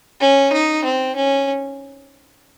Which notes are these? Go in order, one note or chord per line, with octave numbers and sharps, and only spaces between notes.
C#4
D#4
C4
C#4